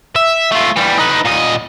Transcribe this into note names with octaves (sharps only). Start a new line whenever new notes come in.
E5
A3 F4
E3 G3
D#4 B4
A#2 D#5